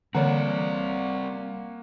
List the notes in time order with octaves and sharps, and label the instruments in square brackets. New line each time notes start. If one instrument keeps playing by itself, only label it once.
[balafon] D3 E3 C#5 [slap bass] G3 [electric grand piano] A#3 F#5 [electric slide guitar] C4 D5